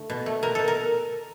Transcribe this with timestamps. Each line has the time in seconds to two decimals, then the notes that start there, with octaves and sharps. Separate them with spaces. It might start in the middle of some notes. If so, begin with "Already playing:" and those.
Already playing: D3 A3
0.10 B2
0.26 A3
0.43 B2 A#4
0.55 B2 A4
0.68 A#4